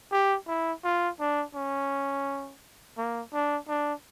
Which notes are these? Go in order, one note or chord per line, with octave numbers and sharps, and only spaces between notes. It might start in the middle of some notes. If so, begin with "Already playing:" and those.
G4
E4
F4
D4
C#4
A#3
D4
D4